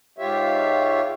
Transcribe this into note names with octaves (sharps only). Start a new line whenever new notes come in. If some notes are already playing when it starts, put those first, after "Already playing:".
G#2 F4 G4 C#5 E5